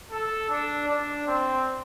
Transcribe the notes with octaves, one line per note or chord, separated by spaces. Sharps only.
A4
D4
D4
C4